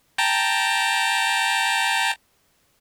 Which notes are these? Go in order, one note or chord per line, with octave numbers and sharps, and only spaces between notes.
G5 A5 A#5